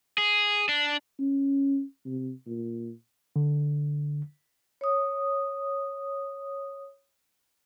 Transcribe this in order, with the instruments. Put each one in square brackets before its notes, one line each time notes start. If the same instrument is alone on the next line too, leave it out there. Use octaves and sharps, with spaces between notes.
[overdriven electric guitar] G#4
D4
[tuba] C#4
C3
A#2
[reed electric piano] D3
[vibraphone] C#5 D#6